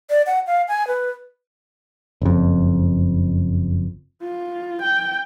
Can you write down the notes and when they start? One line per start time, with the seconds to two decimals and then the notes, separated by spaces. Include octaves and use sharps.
0.10 D5
0.27 F#5
0.47 F5
0.68 G#5
0.87 B4
2.22 F#1 F2
4.22 F4
4.82 G5